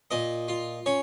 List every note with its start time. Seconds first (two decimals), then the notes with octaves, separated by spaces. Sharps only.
0.11 A#2 D#5
0.48 F4
0.86 C#4 C#5